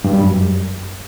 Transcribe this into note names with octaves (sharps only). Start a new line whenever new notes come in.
G2
G3
F#2